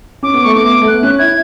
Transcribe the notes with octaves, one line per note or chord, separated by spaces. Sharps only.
C#4 D6
B3
A3 C#6
B3 D6
A3
B3 F#6
C#4
E4 G#6